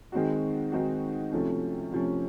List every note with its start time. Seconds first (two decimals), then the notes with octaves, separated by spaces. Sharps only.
0.12 D#3 G#3 C4 D#4 F#4
0.72 D#3 G#3 C4 D#4 F#4
1.32 C3 F3 A3 C#4
1.92 C3 F3 A3 C#4